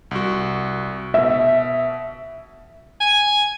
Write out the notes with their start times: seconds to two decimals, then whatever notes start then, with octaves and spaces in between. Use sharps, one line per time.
0.11 C2 F#4
1.14 B2 E5
3.00 G#5